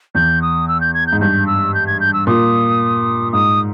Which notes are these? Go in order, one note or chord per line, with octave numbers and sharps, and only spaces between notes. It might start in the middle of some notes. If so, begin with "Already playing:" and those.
E2 G6
D#6
E6
G6
G#6
G6
G#2
G2 G6
E6
G6
G#6
G6
E6
A#2 D#6
G#2 D#6